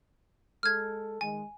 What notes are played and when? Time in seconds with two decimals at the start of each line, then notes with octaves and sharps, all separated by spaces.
0.63 G#3 A4 F6 G#6
1.21 D#3 G#3 G#5